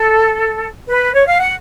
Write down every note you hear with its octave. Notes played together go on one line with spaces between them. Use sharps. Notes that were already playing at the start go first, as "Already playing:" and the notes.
Already playing: A4
B4
C#5
F5
F#5